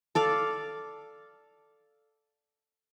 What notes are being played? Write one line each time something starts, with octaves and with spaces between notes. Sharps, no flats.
A4 D5 F5